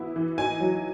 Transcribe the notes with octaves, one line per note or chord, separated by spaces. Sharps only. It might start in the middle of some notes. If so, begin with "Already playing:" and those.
Already playing: E3 B3 E4
E3
D#4 G#5
F#3